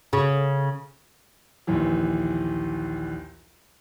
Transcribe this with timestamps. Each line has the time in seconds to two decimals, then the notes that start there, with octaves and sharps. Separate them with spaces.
0.13 C#3
1.67 A#1 D#2 E3